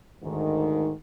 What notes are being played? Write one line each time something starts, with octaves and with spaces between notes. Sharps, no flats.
D2 G#2 D#3